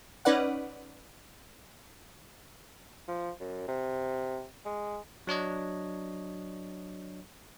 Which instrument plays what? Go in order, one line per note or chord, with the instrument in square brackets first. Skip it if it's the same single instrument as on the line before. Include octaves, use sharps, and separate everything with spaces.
[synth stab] C#4 D#4 B4 D5 F#5
[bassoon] F3
F#2
C3
G#3
[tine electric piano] F#3 D4 C#5 D#5